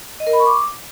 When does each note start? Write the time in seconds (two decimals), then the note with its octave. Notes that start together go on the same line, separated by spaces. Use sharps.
0.20 D#5
0.27 A#4
0.33 B5
0.40 C#6
0.46 D6